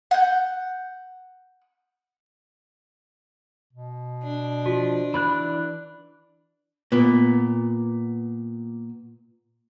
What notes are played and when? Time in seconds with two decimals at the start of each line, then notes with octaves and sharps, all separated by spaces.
0.11 F#5 G6
3.73 B2
4.23 D4
4.66 F3 F#4
5.14 E3 D5 B5 F#6
6.92 A#2 B3